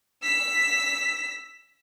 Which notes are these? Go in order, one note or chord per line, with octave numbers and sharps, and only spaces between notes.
E6 B6